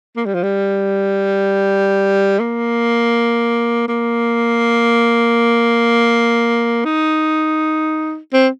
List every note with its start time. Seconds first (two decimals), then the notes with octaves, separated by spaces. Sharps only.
0.17 A#3
0.26 G3
0.34 F3
0.43 G3
2.39 A#3
3.88 A#3
6.85 D#4
8.33 C4